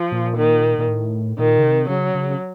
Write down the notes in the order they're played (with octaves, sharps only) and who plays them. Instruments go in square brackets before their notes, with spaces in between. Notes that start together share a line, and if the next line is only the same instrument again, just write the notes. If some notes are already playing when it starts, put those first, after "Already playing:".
Already playing: [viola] F3
[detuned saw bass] A#2
[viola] D#3
[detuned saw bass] A#2
A2
[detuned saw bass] A#2 [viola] D#3
[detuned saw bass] C#3
C3
[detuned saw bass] C#3 [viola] F#3
[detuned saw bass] C#3